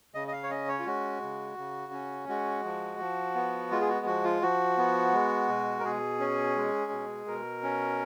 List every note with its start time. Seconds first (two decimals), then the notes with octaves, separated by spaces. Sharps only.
0.14 C#3 D#5
0.28 D#5
0.32 F5
0.43 C#5
0.50 C#4 D#5
0.68 C#5
0.79 F4
0.86 G#3 F#4
1.22 C#3
1.57 C#3
1.92 C#4
2.28 G#3 F#4
2.65 F3
2.99 F3
3.35 B3
3.71 G#3 F4
3.81 G#4
3.89 F#4
4.06 F3 F#4
4.24 F4
4.42 F3 F#4
4.78 B3
5.13 G#3
5.49 B2
5.79 A#4
5.85 B2 G#4
6.20 C#4
6.56 G#3
6.91 B2
7.27 B2 A#4
7.63 C#4